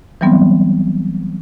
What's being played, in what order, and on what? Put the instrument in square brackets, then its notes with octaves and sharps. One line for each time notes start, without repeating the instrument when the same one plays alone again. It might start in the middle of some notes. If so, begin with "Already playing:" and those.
[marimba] E3 F#3 G3 B3 C4